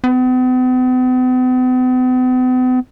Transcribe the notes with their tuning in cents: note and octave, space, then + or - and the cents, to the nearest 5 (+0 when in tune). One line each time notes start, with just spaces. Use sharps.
B3 +45